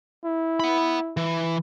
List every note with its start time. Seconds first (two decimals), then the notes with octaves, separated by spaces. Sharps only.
0.25 E4
0.60 F#5 B5
1.17 E3